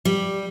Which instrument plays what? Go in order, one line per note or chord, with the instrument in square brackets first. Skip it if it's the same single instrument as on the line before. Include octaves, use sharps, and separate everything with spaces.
[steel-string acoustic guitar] G3